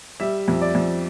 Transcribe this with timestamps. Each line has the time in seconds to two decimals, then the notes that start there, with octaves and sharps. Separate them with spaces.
0.20 G3 E5
0.48 F2
0.61 D5
0.75 F2